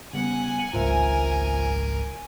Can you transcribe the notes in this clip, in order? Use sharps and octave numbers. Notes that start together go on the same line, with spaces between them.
C#3 G3 B3 F#5 G#5
G#1 C#2 G#2 F4 A#4 C5 E5